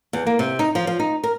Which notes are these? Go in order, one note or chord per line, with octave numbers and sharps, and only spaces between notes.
E2
A#3
C3
D#4
F3
F3
D#4
A#4